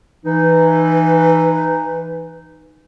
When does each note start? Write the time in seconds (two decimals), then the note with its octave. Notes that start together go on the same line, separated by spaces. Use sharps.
0.25 E3 D#4 B4